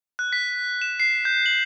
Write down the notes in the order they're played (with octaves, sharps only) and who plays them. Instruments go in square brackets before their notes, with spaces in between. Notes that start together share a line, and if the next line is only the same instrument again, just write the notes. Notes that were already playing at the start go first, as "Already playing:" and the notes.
[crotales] F#6
B6
E7
C7
G6
F#7